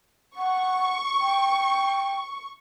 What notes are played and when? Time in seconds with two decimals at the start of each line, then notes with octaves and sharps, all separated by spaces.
0.37 F#5 C#6
1.20 G5